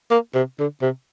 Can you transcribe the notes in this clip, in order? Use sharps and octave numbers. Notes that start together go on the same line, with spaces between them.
A#3
C3
D3
C3